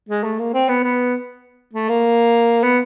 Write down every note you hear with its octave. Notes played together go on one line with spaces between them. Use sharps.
G#3
A3
A#3
C4
B3
B3
A3
A#3
B3